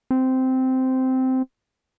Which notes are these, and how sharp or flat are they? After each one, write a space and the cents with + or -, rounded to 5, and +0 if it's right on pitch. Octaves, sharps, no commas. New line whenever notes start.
C4 -10